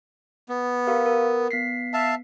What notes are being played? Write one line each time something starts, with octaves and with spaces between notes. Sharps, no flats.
B3
G4 A#4 F5
A#4
B3 B6 C7
E5 F5 A5